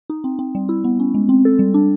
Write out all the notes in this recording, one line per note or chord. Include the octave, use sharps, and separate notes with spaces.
D#4
C4
C4
G3
E4
B3
C#4
G#3
C4
A4
G3
D4